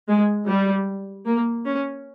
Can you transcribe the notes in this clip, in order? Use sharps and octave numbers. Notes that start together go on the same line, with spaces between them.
G#3
G3
A#3
C#4